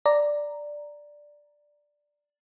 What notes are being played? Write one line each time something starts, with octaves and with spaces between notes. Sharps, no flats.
D5 A#5